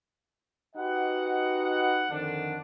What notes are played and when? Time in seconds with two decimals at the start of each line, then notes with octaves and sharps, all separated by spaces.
0.75 D#4 F#4 G4 B4 D#5 F#5
2.10 F2 D3 D#3 D4